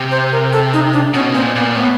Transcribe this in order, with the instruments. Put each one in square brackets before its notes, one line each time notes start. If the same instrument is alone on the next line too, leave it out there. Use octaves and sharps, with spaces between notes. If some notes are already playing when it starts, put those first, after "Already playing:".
Already playing: [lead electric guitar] C3
[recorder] C5
A#4
A4
D#4
D4
[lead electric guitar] B2 [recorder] C#4
[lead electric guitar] A#2 [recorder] C4
[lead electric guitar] A#2 [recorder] B3
[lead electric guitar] A2 [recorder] B3